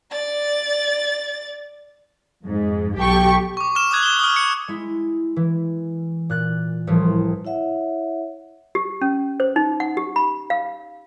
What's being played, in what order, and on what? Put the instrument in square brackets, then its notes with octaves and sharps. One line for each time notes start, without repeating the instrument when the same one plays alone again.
[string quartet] D5 A6
[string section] F2 G#2
B1 G4 A4 G5 C#6
[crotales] C#6 D6
C#6 D6 F6 E7
D6 D#6 F#6 G#6
E7 G7
D#6 F6
C#7
[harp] G#3 E4
E3
A#2 F#6 A6
C2 A2 E3 F3
[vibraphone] E4 C#5 E5 F#5
[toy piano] G4
C#4
C5
D#4
F#5
G4
B5
F5